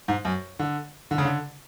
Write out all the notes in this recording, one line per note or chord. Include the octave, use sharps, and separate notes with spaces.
G#2
F#2
D3
D3
C#3
D3